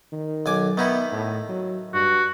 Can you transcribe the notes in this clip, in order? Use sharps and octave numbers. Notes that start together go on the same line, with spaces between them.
D#3
B1 G#5 D6
D#3 B3 D#4 E4
A2
F#3
G2 F#4